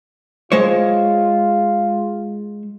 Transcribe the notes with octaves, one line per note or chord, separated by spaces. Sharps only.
G#3 F4 C5 C#5